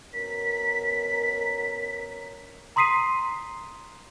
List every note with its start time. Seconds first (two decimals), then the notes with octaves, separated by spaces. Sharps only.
0.13 B2 C#4 A#4 B6
2.76 A#5 C6 D#6 B6 C7 D#7